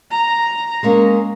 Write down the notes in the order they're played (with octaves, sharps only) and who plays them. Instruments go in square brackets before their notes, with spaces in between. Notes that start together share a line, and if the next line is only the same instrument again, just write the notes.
[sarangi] A#5
[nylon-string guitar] G#3 A#3 C#4